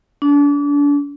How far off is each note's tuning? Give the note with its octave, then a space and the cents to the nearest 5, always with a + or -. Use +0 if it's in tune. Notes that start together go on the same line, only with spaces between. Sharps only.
D4 -35